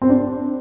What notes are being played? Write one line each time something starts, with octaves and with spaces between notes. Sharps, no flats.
C4
D4